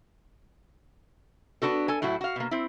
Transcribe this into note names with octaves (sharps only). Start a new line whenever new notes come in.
B3 D4 F#4 A4
A4 G#5
A2 F#3 E4 F#4
F#4 F5
B2 A#3
C4 E4